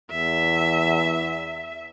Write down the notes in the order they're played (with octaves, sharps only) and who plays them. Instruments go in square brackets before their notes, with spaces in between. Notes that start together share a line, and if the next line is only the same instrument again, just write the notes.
[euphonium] E2 [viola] E5